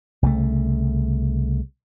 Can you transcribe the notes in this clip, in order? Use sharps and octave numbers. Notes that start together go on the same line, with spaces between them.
C2 C#3 G#3 A3